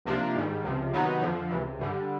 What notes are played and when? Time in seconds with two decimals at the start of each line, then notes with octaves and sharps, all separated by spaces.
0.05 C2 C3 F3 A#3 D4
0.35 G#2 D#3 G3
0.64 C#2 C3 F3
0.93 C3 D#3 F#3 B3 D#4
1.22 F2 D3 F3
1.50 C#2 C3 E3
1.79 G2 D3 G3